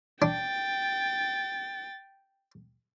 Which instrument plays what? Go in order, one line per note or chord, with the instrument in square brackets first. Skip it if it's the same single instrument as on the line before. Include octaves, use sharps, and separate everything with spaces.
[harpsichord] D4 [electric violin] G5 A6